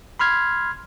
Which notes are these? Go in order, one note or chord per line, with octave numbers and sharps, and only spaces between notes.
B5 C6 F6 G#6